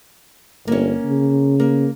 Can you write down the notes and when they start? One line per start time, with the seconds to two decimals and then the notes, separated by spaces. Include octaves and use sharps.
0.68 G1 A#3 C#4
1.06 C#3
1.60 A#3